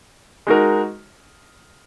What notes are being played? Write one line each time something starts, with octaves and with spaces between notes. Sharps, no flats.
G#3 D#4 F#4 A#4